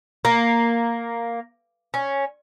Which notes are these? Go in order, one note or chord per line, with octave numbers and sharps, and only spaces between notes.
A#3
C#4